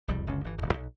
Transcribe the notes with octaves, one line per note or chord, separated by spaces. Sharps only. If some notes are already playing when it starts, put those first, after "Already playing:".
E1 C2 F2 G3
F#1 C#2 D3 C#4
G1 E3
D1 G#1
B1